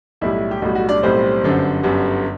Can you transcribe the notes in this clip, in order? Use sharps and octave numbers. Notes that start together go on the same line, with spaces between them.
B1 A2 G3 E4
G4
B1 A2 G3 F#4
F#4
D4 D5
B1 A2 G3 C4 C5
G1 F#2 D3 G3
G1 F#2 D3 G3